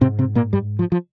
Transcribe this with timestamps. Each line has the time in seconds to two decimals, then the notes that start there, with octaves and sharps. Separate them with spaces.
0.01 G#2 C3 C4
0.19 C3 C4
0.35 A#2 A#3
0.53 G2 G3
0.79 F3
0.92 F3